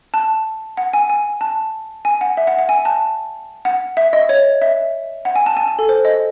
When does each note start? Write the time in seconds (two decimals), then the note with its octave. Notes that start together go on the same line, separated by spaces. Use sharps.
0.14 A5
0.77 F#5
0.93 G#5
1.10 G#5
1.41 A5
2.05 G#5
2.21 F#5
2.37 E5
2.47 F#5
2.59 F#5
2.69 G#5
2.85 A5
3.65 F#5
3.97 E5
4.13 D#5
4.29 C#5
4.62 E5
5.25 F#5
5.36 G#5
5.46 A5
5.57 G#5
5.68 G#5
5.79 A4
5.89 C5
6.05 D#5